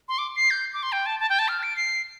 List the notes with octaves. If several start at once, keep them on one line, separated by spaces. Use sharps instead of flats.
C6
D6
C7
G6
D6
C6
G5
A5
A5
G5
A5
F6
D7
C7